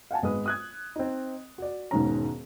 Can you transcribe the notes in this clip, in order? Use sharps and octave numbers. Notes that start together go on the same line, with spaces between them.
F5 F#5 G#5 A5
G#1 G#3 B3 B4 D#6
D#6 F#6 G#6
C4 D#4
F#4 D5
E1 G#2 D#3 C#4 A#5